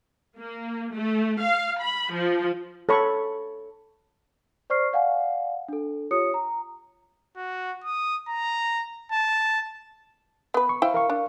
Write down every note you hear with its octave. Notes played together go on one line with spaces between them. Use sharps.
A#3
A3
F5
B5
F3
A4 C#5 B5 C#6
C5 D5 C#6 F6 C7
D5 F5 F#5 G#5
D4 A4
F4 G4 C#5 D#6 C#7
A#5
F#4
D#6
A#5
A5
B3 B4
C#6
E4 C5 F5 G5
A#4 F5 C#6
D4